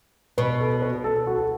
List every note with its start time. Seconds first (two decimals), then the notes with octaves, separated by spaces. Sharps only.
0.38 B2 B4
0.60 A4
0.82 B4
1.04 A4
1.27 F#4
1.35 A4